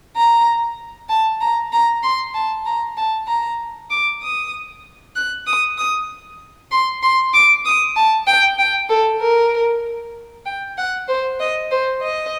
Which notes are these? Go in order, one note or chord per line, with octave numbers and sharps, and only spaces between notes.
A#5
A5
A#5
A#5
C6
A5
A#5
A5
A#5
D6
D#6
F#6
D#6
D#6
C6
C6
D6
D#6
A5
G5
G5
A4
A#4
G5
F#5
C5
D#5
C5
D#5